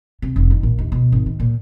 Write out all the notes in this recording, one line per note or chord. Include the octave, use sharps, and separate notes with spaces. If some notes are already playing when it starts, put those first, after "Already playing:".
C3
F1
D#3
A#1
D#2
B2
G#1
D#3
A#2